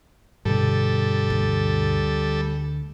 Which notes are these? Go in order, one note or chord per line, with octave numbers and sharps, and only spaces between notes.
G2 B2 D3 G3 A4
D2